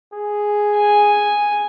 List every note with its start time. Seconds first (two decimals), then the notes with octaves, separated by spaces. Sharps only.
0.13 G#4
0.75 G#5